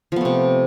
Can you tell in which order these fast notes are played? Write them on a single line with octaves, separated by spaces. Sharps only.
F3 B3 A3 C3